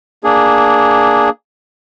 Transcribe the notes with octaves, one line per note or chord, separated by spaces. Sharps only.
A#3 D4 G#4